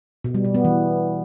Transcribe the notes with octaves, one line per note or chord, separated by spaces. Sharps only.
B2
G3
B2
B3
E3